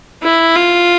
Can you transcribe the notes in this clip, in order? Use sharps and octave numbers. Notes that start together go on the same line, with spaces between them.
E4
F4